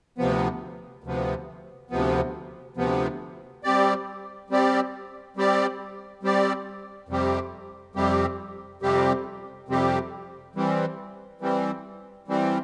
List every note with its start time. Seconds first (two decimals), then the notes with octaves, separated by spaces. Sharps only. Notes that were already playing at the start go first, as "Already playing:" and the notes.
0.18 D2 C3 F3 B3
1.04 D2 C3 F3 B3
1.90 D2 C3 F3 B3
2.77 D2 C3 F3 B3
3.64 G3 C4 G4 D5
4.50 G3 C4 G4 D5
5.37 G3 C4 G4 D5
6.23 G3 C4 G4 D5
7.09 F2 C3 G3 C4 G4
7.95 F2 C3 G3 C4 G4
8.82 F2 C3 G3 C4 G4
9.68 F2 C3 G3 C4 G4
10.55 E3 G3 C4
11.41 E3 G3 C4
12.28 E3 G3 C4